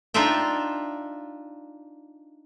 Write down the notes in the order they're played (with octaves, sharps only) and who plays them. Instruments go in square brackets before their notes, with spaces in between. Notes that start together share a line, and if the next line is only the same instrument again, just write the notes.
[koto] D4 D#4 F4 E5 G5